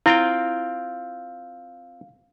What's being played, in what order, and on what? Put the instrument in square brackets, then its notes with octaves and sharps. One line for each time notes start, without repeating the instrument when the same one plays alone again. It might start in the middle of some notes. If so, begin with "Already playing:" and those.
[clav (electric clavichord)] C4 F4 G5 [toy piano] E4 [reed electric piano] F5